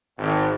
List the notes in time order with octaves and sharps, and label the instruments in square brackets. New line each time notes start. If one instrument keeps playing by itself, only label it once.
[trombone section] G#1